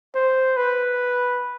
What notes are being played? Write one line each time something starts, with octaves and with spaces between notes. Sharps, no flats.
C5
B4